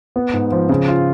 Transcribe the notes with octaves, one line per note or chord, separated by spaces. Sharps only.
B3
G#2
F3
C#3
F4